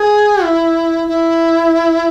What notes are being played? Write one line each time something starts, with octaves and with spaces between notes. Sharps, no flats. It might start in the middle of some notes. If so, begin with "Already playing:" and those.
Already playing: G#4
E4
E4